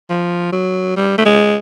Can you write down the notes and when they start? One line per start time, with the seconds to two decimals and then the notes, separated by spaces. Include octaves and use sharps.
0.10 F3
0.52 F#3
0.97 G3
1.18 A3
1.25 G#3